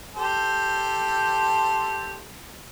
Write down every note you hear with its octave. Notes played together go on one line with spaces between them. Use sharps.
G4 A4 C5